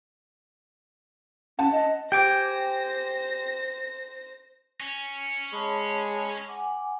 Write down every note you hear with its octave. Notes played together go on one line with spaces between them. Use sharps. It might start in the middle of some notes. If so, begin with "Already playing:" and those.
C#4 F#5 A5
D#5
G4 C5 G5 G#5 D6 G6 A#6 D7
C#4
G#3 C#5 A5 B5
F#5 G#5 D6